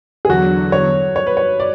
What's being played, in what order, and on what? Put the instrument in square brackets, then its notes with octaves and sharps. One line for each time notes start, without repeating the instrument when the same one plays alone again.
[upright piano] G#4
[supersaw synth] E2 D3 F#3 [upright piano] F#4
[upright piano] C#5
C#5
B4
C#5
D5